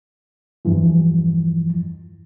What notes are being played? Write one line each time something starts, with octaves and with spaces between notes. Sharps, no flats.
E2 G2 E3 F3